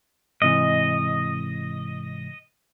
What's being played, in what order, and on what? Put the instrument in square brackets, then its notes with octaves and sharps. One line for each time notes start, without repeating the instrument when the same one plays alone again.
[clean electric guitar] G#2 C3 E3 [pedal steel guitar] D#5